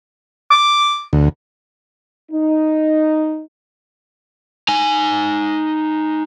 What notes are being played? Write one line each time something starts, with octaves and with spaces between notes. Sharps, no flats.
D6
D2
D#4
D#4 G#5